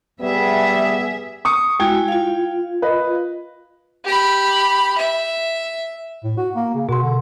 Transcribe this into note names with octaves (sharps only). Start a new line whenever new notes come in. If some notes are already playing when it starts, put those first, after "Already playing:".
G3 B3 G#4 E5
C#6 D#6 C#7
G#3 E4 F#4 G5 G#6
F4 F5
B4 D#5
G4 B5
E5
A2
F#4
A#3
C#3
B2 F#4 C6
D3